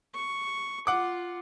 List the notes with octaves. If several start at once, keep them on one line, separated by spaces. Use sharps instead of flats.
C#6
F4 F#5 D6